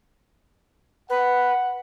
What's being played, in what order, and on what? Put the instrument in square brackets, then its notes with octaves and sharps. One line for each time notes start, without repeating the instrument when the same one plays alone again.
[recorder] B4 [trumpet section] F#5